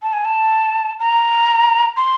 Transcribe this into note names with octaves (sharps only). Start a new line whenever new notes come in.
A5
G#5
A5
A#5
C6